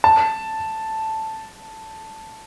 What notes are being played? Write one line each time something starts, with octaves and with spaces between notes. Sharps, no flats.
A5